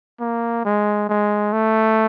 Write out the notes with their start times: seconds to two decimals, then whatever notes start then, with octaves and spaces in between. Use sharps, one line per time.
0.21 A#3
0.65 G#3
1.09 G#3
1.53 A3